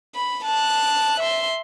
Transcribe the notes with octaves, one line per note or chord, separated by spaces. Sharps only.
B5
A5 F#6
E5 C6